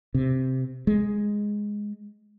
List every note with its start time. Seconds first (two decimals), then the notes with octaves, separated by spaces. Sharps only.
0.14 C3
0.87 G#3